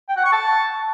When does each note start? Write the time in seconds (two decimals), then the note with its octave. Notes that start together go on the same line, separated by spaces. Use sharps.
0.09 G5
0.16 F#5
0.24 C#6
0.32 A5